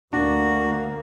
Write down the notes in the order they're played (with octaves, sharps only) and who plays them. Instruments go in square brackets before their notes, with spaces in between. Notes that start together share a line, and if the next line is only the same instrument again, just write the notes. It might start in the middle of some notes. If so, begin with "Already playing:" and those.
[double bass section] D2 A#3 [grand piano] D4 [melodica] F#4